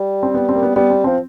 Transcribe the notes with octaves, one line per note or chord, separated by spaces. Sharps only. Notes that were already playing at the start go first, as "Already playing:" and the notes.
Already playing: G3
C4
B3
C4
A#3
B3
G3 B3
C4
F3 C4